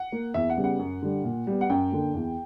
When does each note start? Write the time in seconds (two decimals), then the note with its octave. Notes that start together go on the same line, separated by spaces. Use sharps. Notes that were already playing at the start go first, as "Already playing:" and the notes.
Already playing: F#5
0.12 A#3
0.34 E2 E5
0.50 F#5
0.57 C#3 G3 B3
0.64 F#5
0.79 F#2
1.02 D3 G3
1.24 A#2
1.47 G3 B3
1.61 F#5
1.70 F#2 G5
1.92 D3 A#3
2.14 E2